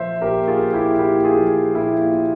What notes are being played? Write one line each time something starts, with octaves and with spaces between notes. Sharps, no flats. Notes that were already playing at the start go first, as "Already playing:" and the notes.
Already playing: A#2 F3 C5 E5
A#2 G4 A#4
F4 G#4
A#2
E4 G4
A#2 E4 G4
F4 G#4
F3
A#2 E4 G4
F4
A#2